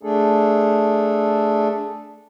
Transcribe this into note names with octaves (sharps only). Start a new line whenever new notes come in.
A3 D4 G#4 A4